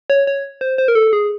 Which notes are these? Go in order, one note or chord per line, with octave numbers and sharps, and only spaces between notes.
C#5
C#5
C5
C5
A#4
A4
G#4